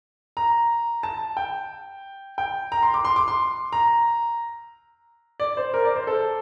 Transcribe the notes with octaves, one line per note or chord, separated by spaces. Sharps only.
A#5
A5
G5
G5
A#5
C6
D6
C6
D6
C6
A#5
D5
C5
A#4
D5
C5
A4